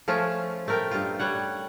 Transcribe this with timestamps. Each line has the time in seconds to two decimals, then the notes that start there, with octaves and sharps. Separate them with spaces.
0.08 F3 A3 C#4 F4
0.68 A3 A#4 G5
0.91 G2 F4
1.19 G3 C#5 F#5